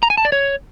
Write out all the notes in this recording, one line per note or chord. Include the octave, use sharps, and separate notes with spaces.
A#5
G#5
A5
D5
C#5